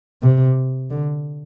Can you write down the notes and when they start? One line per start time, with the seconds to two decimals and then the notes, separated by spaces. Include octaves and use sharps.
0.22 C3
0.90 D3